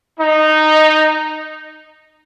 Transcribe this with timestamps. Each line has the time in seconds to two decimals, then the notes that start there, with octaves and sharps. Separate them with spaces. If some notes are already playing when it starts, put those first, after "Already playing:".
0.19 D#4